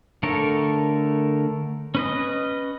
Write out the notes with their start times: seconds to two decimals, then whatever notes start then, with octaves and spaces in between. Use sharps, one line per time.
0.23 D3 A3 A4 A#4 C#5
1.95 C#4 B4 D#5